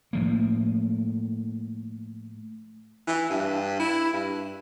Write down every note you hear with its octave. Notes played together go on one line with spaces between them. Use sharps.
A2 F3 A#3
E3
G2
E4
G2